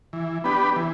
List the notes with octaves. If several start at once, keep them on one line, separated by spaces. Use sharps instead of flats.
E3
B3 D4 G4 B4
E3